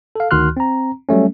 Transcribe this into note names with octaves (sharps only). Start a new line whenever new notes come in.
A4 F5
D2 D#3 F#4 C6 F6 F#6
C4 A#5
F#3 G3 A3 C#4